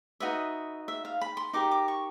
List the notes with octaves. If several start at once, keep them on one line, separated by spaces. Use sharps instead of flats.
D#4 F#4 B4 D#5 E5
E5
F5
B5
C6
D#4 G4 A#4 D6
D6
C#6